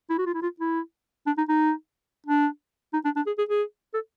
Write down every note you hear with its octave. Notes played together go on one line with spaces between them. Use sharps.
E4
F#4
F4
E4
F4
E4
D4
D#4
D#4
D4
D#4
D4
D4
G#4
G#4
G#4
A4